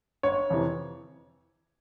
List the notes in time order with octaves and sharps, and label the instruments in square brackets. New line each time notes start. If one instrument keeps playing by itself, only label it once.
[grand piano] G1 C#5
F2 C3 E3